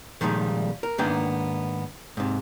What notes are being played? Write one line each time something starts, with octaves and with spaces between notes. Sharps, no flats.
A#2 D#3 F3 G3 G#3
A#4
G#2 D#3 A#3 B3 D4 G5
G#2 C3